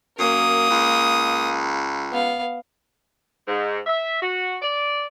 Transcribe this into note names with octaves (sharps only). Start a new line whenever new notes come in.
F#2 A#3 D#6
C#2
B3 F5
G#2
E5
F#4
D5